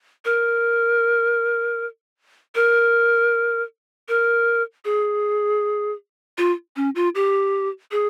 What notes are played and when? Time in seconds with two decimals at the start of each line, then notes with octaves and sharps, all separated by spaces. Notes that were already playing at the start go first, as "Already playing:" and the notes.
0.25 A#4
2.55 A#4
4.09 A#4
4.85 G#4
6.38 F4
6.76 C#4
6.95 F4
7.15 G4
7.91 G#4